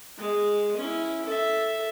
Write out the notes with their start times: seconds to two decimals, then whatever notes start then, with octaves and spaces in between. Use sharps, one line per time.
0.18 G#3
0.76 C#4 E4
1.25 A4 E5